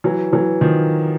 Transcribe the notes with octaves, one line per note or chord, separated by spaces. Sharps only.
E3 F#3
E3 F#3
D#3 F3